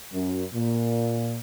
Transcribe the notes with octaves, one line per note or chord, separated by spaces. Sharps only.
F#2
A#2